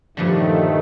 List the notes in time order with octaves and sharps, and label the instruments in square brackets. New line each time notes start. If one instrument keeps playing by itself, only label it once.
[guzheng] G2 A#2 D3 [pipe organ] D#3 A3 [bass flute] F3